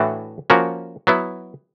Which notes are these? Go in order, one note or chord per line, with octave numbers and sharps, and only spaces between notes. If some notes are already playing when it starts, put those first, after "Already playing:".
Already playing: A2 E3 A3 D4 F#4
F3 A#3 C#4 F#4 A#4
F#3 B3 E4